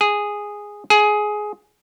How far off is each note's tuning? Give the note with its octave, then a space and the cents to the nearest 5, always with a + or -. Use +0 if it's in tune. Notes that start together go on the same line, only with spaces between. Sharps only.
G#4 -5
G#4 +15